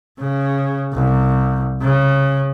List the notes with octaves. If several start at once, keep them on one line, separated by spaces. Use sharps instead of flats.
C#3
C2
C#3